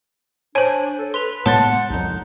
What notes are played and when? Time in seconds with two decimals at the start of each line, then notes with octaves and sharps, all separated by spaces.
0.55 D4 C5 C#5 G#5 A5
0.98 A4
1.14 B4 C6 F7
1.46 A2 G#3 B3 C#5 F#5 A5 C6 A6
1.90 C2 F2 D#4